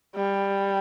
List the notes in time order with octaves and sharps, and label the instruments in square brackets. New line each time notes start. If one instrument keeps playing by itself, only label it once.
[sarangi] G3